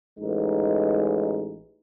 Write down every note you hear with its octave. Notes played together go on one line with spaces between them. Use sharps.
A1 G#3 D#4